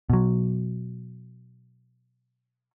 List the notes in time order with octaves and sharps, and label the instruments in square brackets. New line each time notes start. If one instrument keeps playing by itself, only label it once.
[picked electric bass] B2 F#3